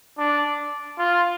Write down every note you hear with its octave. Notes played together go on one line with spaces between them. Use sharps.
D4
F4